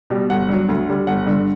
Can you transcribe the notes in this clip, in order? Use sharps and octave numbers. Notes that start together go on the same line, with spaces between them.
B2 G3
G1 F#5
G2 F#3
D2
D3 G3
G1 F#5
G2 D3